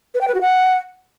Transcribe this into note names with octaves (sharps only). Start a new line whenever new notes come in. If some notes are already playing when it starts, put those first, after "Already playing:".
B4
G5
B4
F#4
F#5